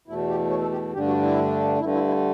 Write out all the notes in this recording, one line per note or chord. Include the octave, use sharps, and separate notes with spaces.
E2 B2 A3 E4
G4
C#5
A4
G4
G2 D3 A3 D4 G4
F#4
E4
G2 D3 A3 E4
E4
E4